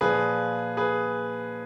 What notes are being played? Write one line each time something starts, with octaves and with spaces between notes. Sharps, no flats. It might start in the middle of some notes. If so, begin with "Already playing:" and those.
A#2 F3 G#4 B4
G#4 B4